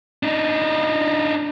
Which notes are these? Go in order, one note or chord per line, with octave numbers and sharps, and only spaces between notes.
D4 D#4